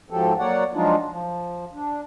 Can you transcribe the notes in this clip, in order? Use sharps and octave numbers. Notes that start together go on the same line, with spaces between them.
G#2 F3 F#3 G4 A4
F#3 A#3 C#5 D5 F#5
F3 F#3 G#3 D4 D#4 F4
F3
D4